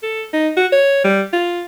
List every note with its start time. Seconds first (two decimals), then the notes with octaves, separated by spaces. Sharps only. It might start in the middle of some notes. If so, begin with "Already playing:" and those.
0.03 A4
0.33 D#4
0.57 F#4
0.72 C#5
1.04 G3
1.33 F4